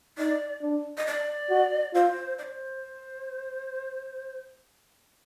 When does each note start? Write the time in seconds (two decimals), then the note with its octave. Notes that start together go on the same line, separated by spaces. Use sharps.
0.18 D#4 D5
0.62 D4
0.97 D#5
1.07 D5
1.50 F#4
1.94 F4 C5
2.38 D5
2.43 C5